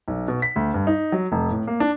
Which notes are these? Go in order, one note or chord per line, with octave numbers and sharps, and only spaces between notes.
B1
B2
B6
D2
G2
D#4
F#3
F1
A2
A#3
D4